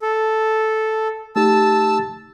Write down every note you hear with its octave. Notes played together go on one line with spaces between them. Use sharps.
A4
A3 D#4 G4 A5 E6